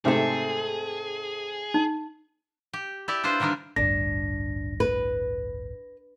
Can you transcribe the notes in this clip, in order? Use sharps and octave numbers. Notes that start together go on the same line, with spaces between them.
G#2 C3 A3 C4 G#4 A4
D#4
G4
E4 G4 D5 E5
D4 E4 F4 B4 C5
D3 D#3 G3 D4 A#4
A1 D2 G2 D4 A#6
B4